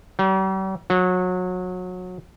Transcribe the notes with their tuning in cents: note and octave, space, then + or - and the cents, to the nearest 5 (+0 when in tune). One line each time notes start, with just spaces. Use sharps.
G3 -45
F#3 -25